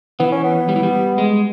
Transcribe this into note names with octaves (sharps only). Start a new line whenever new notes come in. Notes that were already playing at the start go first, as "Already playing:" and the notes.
E3 B3
C#4
B3
G3
E3
G3
G#3